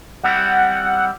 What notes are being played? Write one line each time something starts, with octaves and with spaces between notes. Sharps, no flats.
G3 C4 E4 F#5